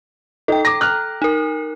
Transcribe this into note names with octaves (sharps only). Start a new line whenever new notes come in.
D#4 A4 G5
A#5 D6 A#6
F6 F#6
D#4 A#4